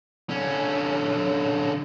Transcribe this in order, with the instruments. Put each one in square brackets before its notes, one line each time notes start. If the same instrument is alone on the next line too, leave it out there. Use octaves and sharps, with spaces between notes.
[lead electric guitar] D3 C#4